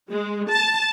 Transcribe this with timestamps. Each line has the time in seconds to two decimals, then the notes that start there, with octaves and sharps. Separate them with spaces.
0.10 G#3
0.49 A5